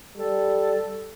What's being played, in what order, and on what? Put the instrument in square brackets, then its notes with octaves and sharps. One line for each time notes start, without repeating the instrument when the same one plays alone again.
[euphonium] G3 [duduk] A4